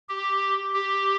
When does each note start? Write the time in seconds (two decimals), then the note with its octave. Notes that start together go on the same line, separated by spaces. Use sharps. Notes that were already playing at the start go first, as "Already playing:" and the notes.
0.09 G4
0.74 G4